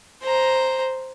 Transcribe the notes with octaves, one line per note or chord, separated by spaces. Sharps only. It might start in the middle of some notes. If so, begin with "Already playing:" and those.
C5 A#5